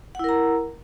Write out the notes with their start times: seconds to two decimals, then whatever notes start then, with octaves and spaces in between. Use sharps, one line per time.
0.15 F#5
0.19 E4
0.24 A#4
0.29 A#5